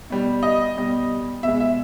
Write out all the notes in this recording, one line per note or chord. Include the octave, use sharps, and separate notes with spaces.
B2 G3
D#5
B2 G3
B2 G#3 E5
E5